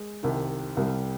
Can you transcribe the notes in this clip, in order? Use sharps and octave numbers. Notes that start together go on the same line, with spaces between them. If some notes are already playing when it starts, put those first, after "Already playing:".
Already playing: G#3
C2 C3 D#3
C2 C3 G3